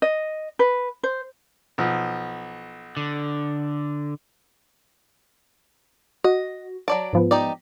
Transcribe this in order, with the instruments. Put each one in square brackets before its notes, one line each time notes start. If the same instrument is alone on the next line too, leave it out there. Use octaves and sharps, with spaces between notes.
[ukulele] D#5
B4
C5
[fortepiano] B1 F3
[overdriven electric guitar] D3
[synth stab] F#4 [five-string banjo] D#5
[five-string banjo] F#3 D5 A5 [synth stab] D7
[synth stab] G#2 F3 B3
[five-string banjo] D#4 G4 D5